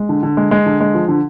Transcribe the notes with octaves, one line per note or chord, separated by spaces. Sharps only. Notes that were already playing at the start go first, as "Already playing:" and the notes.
Already playing: G#3
D3
D3
G#3
G#3
D3
G#3
F3
D3